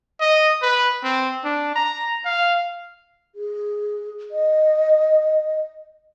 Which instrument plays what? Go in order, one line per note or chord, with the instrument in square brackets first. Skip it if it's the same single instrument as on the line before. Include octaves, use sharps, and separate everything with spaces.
[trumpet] D#5
B4
C4
D4
A#5
F5
[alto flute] G#4
D#5